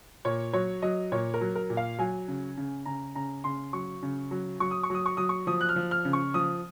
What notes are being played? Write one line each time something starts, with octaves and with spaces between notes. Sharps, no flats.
A#2 C#5
F#3 C#5
F#3 D#5
A#2 C#5
A#4
F#3
A#4
A#2
F5
F#3 G#5
C#3
C#3
C#3 A#5
C#3 A#5
C#3 C6
F#3 C#6
C#3
F#3
F#3 C#6
D#6
C#6
F#3 D#6
C#6
F#3 D#6
C#6
F3 D#6
F#6
F6
F3
F6
C#3
C#6
F3 D#6